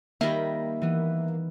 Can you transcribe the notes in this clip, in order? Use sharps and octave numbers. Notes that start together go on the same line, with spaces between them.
D#3 G3 A#3 E5 A#5 B5 A#6
E3 B3